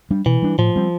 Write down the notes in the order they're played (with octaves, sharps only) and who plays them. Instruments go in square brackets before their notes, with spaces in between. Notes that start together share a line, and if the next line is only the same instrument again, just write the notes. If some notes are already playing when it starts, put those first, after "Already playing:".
[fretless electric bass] G3 D4
[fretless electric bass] B2 [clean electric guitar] E3
[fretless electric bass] G3 D4
[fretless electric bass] A2 [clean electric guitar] F3
[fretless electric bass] G3 C4